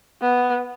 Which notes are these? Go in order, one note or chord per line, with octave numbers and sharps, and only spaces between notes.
B3